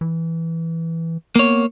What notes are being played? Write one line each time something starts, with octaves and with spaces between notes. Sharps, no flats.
E3
A#3 B3 C#5